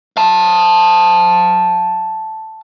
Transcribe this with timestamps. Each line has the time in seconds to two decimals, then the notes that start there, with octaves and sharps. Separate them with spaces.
0.17 F5 A5